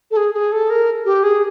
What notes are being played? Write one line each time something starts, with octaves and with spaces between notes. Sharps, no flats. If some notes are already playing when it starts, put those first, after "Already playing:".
A4
G#4
G#4
A4
A#4
G4
G#4